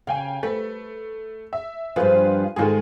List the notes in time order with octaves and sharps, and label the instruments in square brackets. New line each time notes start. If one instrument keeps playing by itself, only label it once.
[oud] C#3 [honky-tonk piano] F5 G5 G#5
[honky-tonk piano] A3 [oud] B4
[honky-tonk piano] E5
[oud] G2 F3 [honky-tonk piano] F4 G#4 B4
[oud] G#2 G#3 A4 [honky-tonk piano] D#3 F4 G#4